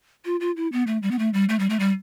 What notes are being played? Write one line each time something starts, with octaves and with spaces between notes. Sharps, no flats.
F4
F4
E4
B3
A3
G3
B3
A3
G3
A3
G3
A3
G3